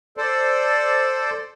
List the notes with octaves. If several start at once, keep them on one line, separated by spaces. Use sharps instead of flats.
A4 C5 D5